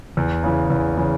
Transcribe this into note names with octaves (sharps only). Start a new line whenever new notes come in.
E2
C#3 E3
E2
C#3 E3